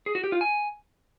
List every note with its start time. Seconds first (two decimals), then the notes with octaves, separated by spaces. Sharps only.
0.06 G#4
0.15 F#4
0.24 G4
0.32 F4
0.41 G#5